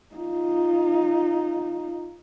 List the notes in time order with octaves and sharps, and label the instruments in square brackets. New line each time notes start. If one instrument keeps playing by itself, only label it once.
[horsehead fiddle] D#4 F4